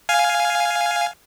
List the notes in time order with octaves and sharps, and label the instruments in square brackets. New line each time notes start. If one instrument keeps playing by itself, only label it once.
[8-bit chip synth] F5 G#5